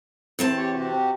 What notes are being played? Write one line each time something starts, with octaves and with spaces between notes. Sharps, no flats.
E2 C4 A5
G4 C#5
C3 F#4 G4